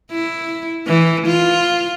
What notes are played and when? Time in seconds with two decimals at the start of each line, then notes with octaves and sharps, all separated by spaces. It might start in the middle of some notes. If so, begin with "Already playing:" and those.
0.11 E4
0.87 E3
1.27 F4